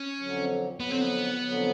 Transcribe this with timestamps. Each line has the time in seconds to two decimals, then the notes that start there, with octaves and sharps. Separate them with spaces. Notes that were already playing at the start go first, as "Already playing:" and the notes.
Already playing: C#4
0.19 F2 D3 F#3
0.80 F2 D3 F#3 B3
0.91 C4
1.02 B3
1.42 F2 D3 F#3